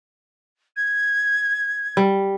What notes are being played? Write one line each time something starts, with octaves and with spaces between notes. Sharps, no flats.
G#6
G3